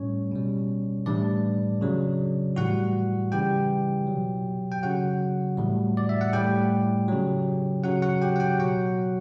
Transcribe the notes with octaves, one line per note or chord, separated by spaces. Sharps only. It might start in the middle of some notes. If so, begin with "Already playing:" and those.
Already playing: A2 G3 C#4 C#5
B2 G3
A2 E3 G3 D4 D5
C#3 F#3
A2 E3 G3 F#4 F#5
C#3 E3 G3 G4 G5
B2 F#3
G5
C#3 F#3 F#4 F#5
A2 E3 G3
D5
E5
F#5
A2 G3 G4 G5
C#3 F#3
C#3 F#3 F#4 F#5
F#4 F#5
G4 G5
F#5
G4 G5
B2 F#3 F#4 F#5